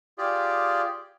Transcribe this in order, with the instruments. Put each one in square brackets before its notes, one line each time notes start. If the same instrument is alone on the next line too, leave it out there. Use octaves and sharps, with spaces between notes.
[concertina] F4 G4 G#4 D5